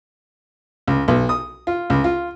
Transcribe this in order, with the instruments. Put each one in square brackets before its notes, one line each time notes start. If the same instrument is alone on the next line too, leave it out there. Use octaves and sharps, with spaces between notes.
[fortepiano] C#2
B1
D#6
F4
C#2
F4